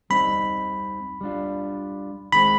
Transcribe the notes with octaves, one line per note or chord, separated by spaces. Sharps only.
G3 C4 D#4 B5
G3 D4 F4
D#3 G#3 C4 B5